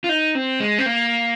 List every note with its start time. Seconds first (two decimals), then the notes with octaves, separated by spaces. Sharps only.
0.04 F4
0.09 D#4
0.35 C4
0.60 G#3
0.78 C4
0.86 A#3